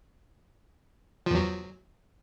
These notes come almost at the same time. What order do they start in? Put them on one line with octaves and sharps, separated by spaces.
F3 E2 F#3